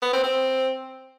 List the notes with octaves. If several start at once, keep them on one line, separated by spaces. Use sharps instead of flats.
B3
C4
C4